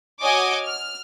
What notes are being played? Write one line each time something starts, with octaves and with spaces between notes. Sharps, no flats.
F#4 C#5 D#5 G#5 D6
F6